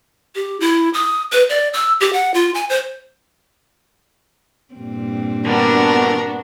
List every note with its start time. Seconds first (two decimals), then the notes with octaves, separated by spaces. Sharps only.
0.35 G4
0.60 E4
0.94 D#6
1.33 B4
1.49 D5
1.73 E6
2.00 G4
2.13 F#5
2.34 F4
2.55 G#5
2.69 C5
4.74 G2 A#2 C4
5.46 D3 G3 B3 D4 F#4 A#4